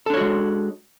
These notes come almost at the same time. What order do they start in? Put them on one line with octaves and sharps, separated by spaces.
A4 D4 C#5 F#4 G#3